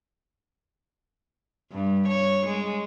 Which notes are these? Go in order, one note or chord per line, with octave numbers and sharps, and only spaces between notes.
G2
C#5
G#3